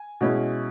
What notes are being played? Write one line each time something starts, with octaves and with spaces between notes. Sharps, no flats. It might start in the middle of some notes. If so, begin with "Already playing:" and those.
Already playing: G#5
B2 G#3 C#4 E4